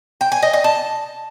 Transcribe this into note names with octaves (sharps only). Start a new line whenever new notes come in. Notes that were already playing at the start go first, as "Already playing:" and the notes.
G5
G#5
D#5
D#5
A5